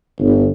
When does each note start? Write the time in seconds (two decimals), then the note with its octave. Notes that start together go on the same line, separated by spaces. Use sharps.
0.19 G1